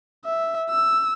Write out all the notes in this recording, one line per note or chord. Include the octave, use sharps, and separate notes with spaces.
E5
E6